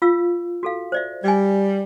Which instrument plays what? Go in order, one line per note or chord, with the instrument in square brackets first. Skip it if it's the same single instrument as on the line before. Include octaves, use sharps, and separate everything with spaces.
[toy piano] F4 F5 E6
F#4 A4 F5
C5 D5 E5
[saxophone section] G3 [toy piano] D5 G#5